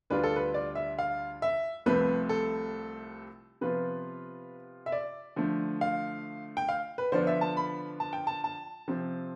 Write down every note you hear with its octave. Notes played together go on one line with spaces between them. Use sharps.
D2 D3 G3 D4 F4 B4
A4
B4
D5
E5
F5
E5
C2 C3 F3 A3 C4 B4
A4
C3 F3 B3 F4 B4
E5
D5
D3 F3 A3
F5
G5
F5
B4
D3 F3 B3 D4 F4 C5
E5
A5
B5
A5
G5
A5
A5
C3 F3 C4